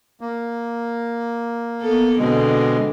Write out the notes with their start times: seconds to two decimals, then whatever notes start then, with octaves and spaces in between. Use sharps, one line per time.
0.21 A#3
1.81 B3 A4
2.18 B2 D3 G#3 C4